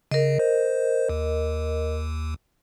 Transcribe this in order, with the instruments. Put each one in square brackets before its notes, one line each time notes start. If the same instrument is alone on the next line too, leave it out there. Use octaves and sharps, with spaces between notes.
[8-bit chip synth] C#3 [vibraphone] A#4 D#5
[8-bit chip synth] C5
D#2